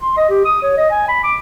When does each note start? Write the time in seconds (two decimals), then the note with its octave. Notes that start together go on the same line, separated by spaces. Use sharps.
0.02 C6
0.17 D#5
0.30 G4
0.45 D#6
0.62 C#5
0.77 D#5
0.91 G#5
1.08 B5
1.24 D6